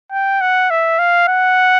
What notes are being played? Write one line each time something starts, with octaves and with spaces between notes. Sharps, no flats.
G5
F#5
E5
F5
F#5